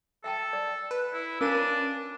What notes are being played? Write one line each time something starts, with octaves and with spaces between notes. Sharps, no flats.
A4 E5 G5 A5
D5
B4
E4
C#4 D4 F4 A#4 F5 D6 D#7